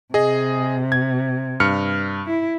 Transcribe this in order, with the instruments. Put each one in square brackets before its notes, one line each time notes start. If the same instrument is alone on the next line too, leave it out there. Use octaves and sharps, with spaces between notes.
[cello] C3 [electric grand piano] G#4 D#5
[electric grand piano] G#6
G2 F6 C#7
[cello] E4